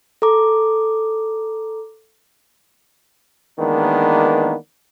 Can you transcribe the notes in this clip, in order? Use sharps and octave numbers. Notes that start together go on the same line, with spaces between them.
A4 A#5 D6
D#3 E3 G#3 A#3 B3 D4